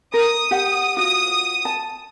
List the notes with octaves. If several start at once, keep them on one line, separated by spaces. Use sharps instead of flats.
A#4 D#6
G4 F#5
F4 F#4 D#6
A5